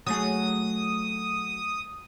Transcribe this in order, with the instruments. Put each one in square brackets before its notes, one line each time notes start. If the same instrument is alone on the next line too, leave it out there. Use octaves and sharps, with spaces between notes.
[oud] F#3 A3 G#4 [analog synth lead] D#6